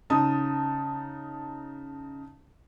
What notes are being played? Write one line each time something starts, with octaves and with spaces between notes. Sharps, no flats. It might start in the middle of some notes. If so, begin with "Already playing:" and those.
C#3 D#4 A5 D#6